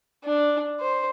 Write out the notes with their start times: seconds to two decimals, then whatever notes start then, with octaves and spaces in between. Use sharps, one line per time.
0.24 D4
0.80 C5